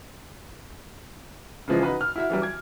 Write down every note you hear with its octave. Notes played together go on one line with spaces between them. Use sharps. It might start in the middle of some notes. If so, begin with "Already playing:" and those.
C#3 E3 F3 G#3
D#4 F#4 B4
F6
E4 F#4 E5
E3 F#3 G3
D6 G#6